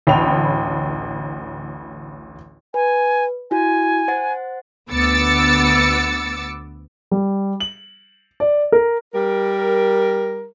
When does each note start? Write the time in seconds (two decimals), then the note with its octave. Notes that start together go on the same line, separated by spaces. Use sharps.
0.07 A1 D2 C#5 G5 B5 F7
2.74 B4 G#5
3.51 E4 F#4 G#5
4.08 C5 F#5 A6
4.91 D2 B3 D6 E6 A6 C#7
7.11 G3
7.60 F#7
8.40 D5
8.72 A#4
9.14 G3 A#4